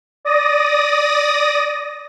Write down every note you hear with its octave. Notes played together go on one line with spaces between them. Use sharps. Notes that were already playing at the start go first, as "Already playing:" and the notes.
D5 D#6 A#6